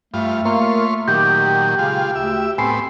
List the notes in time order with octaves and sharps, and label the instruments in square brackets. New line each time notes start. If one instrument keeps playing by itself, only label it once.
[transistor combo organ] G2 F4 [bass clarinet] A3
[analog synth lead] A#3 [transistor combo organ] F4 C#5 C6
[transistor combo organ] A#2 D#3 F#3 [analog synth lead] G4 [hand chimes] G6
[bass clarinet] C#3 [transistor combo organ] G#3 F4
[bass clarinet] D2 [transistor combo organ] E5
[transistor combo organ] A2 B3 [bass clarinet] C4 [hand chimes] G#5 C7